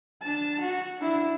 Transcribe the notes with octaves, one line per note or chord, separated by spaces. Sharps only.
D4 A5
F#4
D4 E4